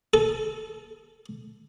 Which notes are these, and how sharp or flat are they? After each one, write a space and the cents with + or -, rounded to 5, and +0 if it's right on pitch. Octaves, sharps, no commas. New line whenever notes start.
A4 -20